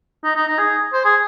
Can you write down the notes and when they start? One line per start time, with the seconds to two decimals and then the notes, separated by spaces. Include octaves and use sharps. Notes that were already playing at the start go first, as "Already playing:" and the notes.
0.24 D#4
0.35 D#4
0.47 D#4
0.59 G#4
0.93 C5
1.05 G#4